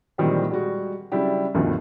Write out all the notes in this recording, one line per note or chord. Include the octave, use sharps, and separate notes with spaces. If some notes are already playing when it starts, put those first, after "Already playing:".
A#2 D#3 E3 F#3 G3 C4
G3 G#3 F#4
C#3 F#3 G3 D4 E4 G4
D2 G2 B2 D#3 F3